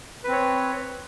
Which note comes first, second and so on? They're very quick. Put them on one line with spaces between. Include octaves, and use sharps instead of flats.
B4 C4 C#5